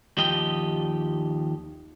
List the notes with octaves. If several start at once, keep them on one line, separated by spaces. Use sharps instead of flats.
D#2 F3 G4 D#5 G5